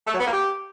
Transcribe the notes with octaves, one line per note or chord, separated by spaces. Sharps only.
A3
F#3
B3
A#3
G4